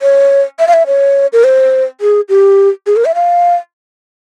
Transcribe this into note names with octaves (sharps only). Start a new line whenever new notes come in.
C#5
E5
F5
E5
C#5
A#4
C5
G#4
G4
G#4
A#4
E5
F5